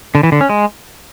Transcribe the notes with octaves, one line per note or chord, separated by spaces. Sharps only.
D3
E3
D3
C#4
G#3